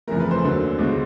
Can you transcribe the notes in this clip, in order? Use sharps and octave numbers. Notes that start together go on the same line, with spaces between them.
G1 F2 C#3 E3 A3 A#4
B4
C5
D#2 D3 F#3
C#2 B2 G#3